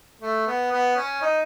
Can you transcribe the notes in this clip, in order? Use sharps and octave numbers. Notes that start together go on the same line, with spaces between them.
A3
B3
B3
C#4
D#4